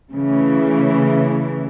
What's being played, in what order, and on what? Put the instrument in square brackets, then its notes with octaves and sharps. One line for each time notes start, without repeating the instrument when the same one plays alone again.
[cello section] C#3 E3 A3